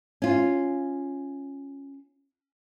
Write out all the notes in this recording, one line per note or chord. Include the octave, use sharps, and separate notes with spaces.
C#4 F4